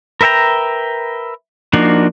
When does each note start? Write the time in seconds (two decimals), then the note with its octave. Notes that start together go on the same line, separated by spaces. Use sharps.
0.21 A#4 B4 E5 G5 A#5
1.73 F3 A#3 D4 D#4 F#4